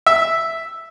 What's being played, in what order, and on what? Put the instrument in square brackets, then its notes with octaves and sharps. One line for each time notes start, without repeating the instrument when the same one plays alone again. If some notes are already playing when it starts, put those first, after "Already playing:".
[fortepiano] E5